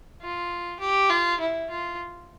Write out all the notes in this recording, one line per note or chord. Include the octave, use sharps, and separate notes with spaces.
F4
G4
F4
E4
F4